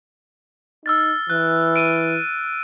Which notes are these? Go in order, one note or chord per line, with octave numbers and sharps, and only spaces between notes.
D#4 E6 F6 A6
E3 F#6
F6 D7 D#7